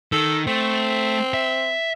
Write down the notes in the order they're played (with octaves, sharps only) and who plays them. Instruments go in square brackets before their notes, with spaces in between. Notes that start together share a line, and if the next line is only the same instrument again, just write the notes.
[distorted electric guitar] D#3 [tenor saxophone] A4
[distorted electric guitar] A3 [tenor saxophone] C4
[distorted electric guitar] E5